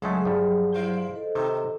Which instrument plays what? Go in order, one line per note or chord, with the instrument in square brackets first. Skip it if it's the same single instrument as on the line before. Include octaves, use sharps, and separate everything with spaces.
[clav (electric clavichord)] C#2 G#3 A3 [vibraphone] F#3 [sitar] G#4
[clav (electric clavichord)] G2 F3
[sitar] E4 F4 C5
[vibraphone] A4 C5 D#5
[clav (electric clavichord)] C3 D#3 [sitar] D#4